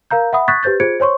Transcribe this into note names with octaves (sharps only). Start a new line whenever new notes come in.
A#4 F5 A#5 G6
E5 F#5 B5 D#6
C#6 D#6 F#6 G#6 A6 B6
G4 B4 C5 G6 A6
F4 G#4 C5 G#6 C#7 D7
C5 C#5 C6 C#6